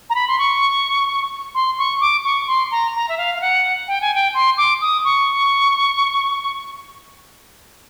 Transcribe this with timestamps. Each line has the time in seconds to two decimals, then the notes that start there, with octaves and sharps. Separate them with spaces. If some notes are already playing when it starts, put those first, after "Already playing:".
0.10 A#5
0.15 B5
0.28 C6
0.39 C#6
1.54 C6
1.78 C#6
2.01 D6
2.24 C#6
2.47 C6
2.71 A#5
2.95 A#5
3.08 E5
3.18 F5
3.35 F5
3.41 F#5
3.88 G5
4.01 G#5
4.14 G5
4.34 C6
4.57 D6
4.81 D#6
5.05 C#6